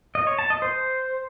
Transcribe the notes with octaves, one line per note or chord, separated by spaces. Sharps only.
D#5
C#5
A5
D#5
C5